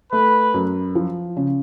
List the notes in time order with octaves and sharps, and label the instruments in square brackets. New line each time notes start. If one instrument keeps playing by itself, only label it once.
[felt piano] A3 [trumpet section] B4
[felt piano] F#2
F3
C#3